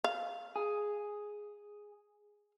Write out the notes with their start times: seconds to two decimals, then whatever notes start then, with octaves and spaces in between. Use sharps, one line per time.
0.04 F5
0.56 G#4